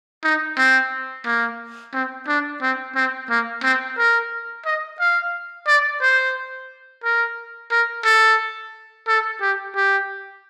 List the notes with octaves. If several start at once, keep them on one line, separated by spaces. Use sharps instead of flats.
D#4
C4
A#3
C4
D4
C4
C4
A#3
C4
A#4
D#5
F5
D5
C5
A#4
A#4
A4
A4
G4
G4